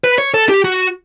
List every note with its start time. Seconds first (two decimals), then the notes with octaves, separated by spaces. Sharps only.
0.04 B4
0.18 C#5
0.34 A4
0.49 G4
0.64 F#4